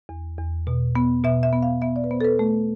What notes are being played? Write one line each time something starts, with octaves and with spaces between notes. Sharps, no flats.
E2
E2
B2
B3
B2 E5
E5
B3
F5
B3 E5
D5
B4
B3 C5
A4
B4
A3